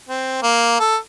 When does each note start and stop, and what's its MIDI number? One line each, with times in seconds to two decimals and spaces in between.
0.09 0.42 60
0.43 0.75 58
0.80 0.96 69